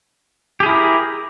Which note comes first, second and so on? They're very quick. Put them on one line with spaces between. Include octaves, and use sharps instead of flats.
G4 G#4 E4 A#4